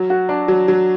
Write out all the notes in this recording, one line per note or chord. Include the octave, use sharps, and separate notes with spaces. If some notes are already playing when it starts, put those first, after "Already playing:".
Already playing: F#3
F#4
D4
F#3
F#3